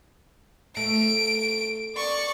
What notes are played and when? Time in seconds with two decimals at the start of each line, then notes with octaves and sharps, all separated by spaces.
0.77 A3 D7
1.96 D5 C#6